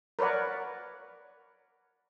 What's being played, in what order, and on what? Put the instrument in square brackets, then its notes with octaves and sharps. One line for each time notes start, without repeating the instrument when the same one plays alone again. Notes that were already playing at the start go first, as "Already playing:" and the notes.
[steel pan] A#4 B4 C#5 D5 F#5